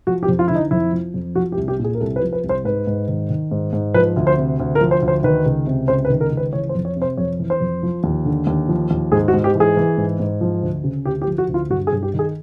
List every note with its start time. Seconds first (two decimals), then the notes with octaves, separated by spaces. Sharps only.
0.07 F3 F#4
0.23 G4
0.28 F2
0.39 F4
0.48 D3 E4
0.55 D#4
0.71 F2 E4
0.92 F3
1.14 F2
1.35 F3 F#4
1.52 G4
1.57 C2
1.68 G4
1.79 A#2
1.84 G#4
1.95 A#4
2.00 C2 A4
2.16 B4
2.22 F3
2.33 B4
2.44 C2
2.49 C5
2.65 G#2 B4
2.87 G#2
3.08 D#3
3.30 D#3
3.51 G#2
3.73 G#2
3.94 F3 B4
4.16 D2
4.27 C5
4.38 C3
4.60 D2
4.75 A#4
4.81 F3
4.91 C5
5.02 D2
5.08 C5
5.23 D#3 B4
5.45 C#2
5.66 C3
5.88 C#2 C5
6.05 B4
6.10 D#3
6.21 A#4
6.32 C#2
6.37 B4
6.53 E3 C#5
6.69 C5
6.75 F2
6.85 C#5
6.96 C3
7.02 C5
7.17 F2 C#5
7.39 E3
7.50 C5
7.60 F2
7.83 F3
8.04 D#2
8.25 D3
8.47 D#2
8.69 F3
8.91 D#2
9.12 G#2 G#4
9.28 F#4
9.33 G#2
9.44 G4
9.55 E3
9.60 G#4
9.77 E3
9.97 G#2
10.20 G#2
10.41 F3
10.63 D2
10.84 C#3
11.05 D2 G4
11.22 G4
11.27 F3
11.38 F#4
11.49 D2
11.54 F4
11.70 G2 F#4
11.87 G#4
11.93 G2
12.03 G4
12.14 D#3
12.19 G#4